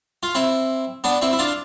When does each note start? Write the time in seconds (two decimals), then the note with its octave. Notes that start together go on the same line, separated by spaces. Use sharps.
0.23 F4
0.35 C4 E4
1.04 B3 D4
1.22 C4 E4
1.33 E4
1.39 D4 F4